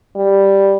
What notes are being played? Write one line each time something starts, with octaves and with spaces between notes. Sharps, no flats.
G3